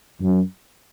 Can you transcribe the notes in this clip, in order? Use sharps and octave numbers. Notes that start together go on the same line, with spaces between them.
F#2